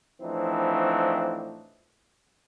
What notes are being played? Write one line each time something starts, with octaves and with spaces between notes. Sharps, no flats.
A2 E3 F3 C4 D4 D#4